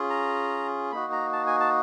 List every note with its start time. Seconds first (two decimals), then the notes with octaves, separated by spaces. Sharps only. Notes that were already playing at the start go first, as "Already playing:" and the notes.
Already playing: C#4 F4 G#4
0.10 A#5
0.92 A#3 D#4 F#4 B5
1.12 A#5
1.33 A5
1.47 G#5
1.60 A5